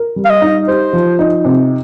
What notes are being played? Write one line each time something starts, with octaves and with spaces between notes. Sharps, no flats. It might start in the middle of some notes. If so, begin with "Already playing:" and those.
Already playing: A#4
G3
F5
D#5
D#4
G4 C5
F3
D#4
C3